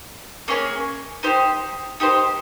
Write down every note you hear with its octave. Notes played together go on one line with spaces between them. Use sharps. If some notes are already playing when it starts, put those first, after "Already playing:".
A#3 C#4 G#4 C#5
D#4 G4 C5
D#4 G4 C5